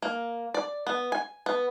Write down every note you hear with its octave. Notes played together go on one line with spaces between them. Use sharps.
A#3
D5
B3
G#5
B3